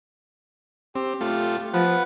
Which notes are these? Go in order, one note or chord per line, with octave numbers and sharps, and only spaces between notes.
C4 G4
A3 F4
F3 B4 F#5